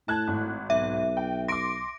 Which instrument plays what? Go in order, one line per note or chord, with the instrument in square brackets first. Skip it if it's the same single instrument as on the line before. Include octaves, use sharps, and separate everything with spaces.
[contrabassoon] A2 [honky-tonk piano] A5 F#6 G#6
[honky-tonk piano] G#1
[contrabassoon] B1 [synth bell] E5
[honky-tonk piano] G5
[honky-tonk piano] C6 D6 [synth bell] A#6 D7